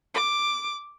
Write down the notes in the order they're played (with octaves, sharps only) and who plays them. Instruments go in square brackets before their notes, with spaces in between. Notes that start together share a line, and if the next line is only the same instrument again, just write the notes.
[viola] D6